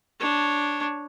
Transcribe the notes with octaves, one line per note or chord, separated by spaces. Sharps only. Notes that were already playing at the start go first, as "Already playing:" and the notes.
D4 C#5